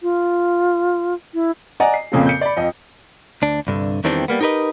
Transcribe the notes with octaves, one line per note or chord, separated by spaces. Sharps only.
F4
E4
D5 D#5 F#5 G#5 A#5
C7
F2 A#2 C#3 A#3 C4 A4
G6 C#7
D5 B5
F2 D#5 G5
D2 D4
C2 G2 D3
E2 D#3 E3 G3 C4 D4
G3 A#3 B3
D#4 G4 A#4 B4 D#5